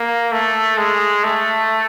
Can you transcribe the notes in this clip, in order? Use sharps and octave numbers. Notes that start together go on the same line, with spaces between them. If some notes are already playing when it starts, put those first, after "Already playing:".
Already playing: A#3
A3
G#3
A3